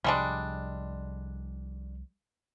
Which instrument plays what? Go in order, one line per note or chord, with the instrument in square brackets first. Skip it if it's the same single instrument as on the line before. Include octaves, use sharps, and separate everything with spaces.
[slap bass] C2 F3 [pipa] G3 G#3 D4